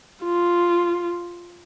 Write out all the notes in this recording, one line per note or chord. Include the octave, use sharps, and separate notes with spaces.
F4